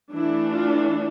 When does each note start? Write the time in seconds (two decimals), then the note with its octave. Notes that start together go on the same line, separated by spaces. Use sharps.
0.13 E3 A3 D4 E4
0.51 F4